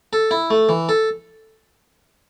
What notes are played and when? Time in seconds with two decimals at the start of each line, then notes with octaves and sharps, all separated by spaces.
0.13 A4
0.31 E4
0.50 A3
0.69 E3
0.89 A4